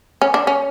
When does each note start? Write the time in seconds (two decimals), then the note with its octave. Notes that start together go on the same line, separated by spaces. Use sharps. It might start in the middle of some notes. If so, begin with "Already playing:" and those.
0.22 C#4
0.34 D4
0.47 C#4